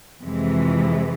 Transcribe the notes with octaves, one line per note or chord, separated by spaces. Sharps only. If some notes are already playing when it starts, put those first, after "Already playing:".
F2 C3 E3 G#3